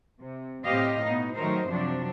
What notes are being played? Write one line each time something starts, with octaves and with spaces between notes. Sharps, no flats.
C3
A2 C3 C4 G4 D#5 F5
B2 B3 D#4
D#3 F#3 A3 D#4 A#4 C5
F#2 C3 F3 F#3 D4